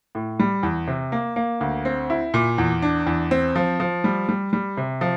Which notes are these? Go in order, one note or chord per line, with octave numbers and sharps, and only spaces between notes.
A2
G3
E2
C3
A#3
A#3
D2
C4
E4
A#2
E2
D4
E2
C4
F3
F3
G3
G3
G3
C3
F3